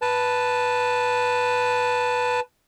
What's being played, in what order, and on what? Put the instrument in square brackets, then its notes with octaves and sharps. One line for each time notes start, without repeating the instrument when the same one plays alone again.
[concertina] B4 A5